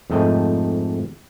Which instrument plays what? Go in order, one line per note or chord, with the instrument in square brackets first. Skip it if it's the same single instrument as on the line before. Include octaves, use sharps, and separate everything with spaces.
[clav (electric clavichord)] F2 G#2 A3 D#5 G5